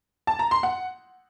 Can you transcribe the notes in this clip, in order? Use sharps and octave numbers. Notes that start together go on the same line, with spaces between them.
A5
A#5
C6
F#5